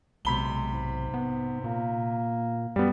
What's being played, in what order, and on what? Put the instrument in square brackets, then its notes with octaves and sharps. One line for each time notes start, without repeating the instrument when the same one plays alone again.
[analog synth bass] B1 [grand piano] C3 B5 G7 [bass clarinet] G#3
[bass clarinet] G#2
[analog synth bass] B3
[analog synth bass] A#2 [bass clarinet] A#3
[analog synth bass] F#2 [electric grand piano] G3 B3